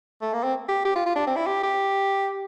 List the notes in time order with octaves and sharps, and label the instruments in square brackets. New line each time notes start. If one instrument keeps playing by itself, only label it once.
[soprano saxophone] A3
A#3
C4
G4
G4
F4
F4
D4
C4
E4
G4
G4